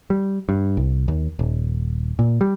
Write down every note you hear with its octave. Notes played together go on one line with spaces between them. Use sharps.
G3
G2
C2
D#2
D#1
A#2
G3